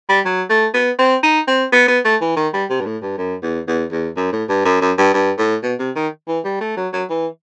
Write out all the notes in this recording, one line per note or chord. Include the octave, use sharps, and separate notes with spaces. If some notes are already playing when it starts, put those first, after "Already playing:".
G3
F#3
A3
B3
C4
D#4
C4
B3
B3
A3
E3
D#3
G3
C3
G2
A2
G2
F#2
E2
E2
E2
F#2
A2
G2
F#2
F#2
G2
G2
A2
B2
C3
D#3
E3
G3
A3
F#3
F#3
E3